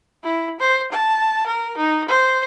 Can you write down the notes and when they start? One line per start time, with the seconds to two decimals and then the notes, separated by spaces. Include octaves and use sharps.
0.24 E4
0.60 C5
0.91 A5
1.47 A#4
1.77 D#4
2.08 C5